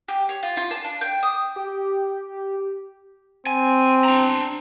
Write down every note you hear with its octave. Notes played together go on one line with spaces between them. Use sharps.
G4
C#5
F4
F4
A5
D4
G5
D#6
G4
C4 G#5
D4 A#5